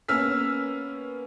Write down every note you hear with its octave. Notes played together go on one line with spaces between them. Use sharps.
A#3 B3 C#4 E6 F6 B6